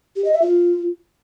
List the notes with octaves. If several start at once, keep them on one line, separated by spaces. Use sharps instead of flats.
G4
D#5
E5
F4